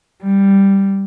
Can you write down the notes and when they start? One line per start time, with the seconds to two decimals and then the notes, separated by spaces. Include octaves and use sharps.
0.23 G3